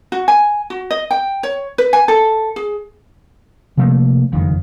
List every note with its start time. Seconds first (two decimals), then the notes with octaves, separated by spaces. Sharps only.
0.12 F#4
0.28 G#5
0.70 F#4
0.91 D#5
1.11 G5
1.43 C#5
1.78 B4
1.93 G#5
2.08 A4
2.56 G#4
3.77 C3 F3 A3 A#3
4.32 F#1 F2 D#3